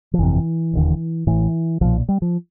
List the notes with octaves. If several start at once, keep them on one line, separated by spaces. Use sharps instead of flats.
F3
G1 F2 C3 E3
E1 D#2 D3
A1 A2 E3
B1 A#2 F3
G3
F3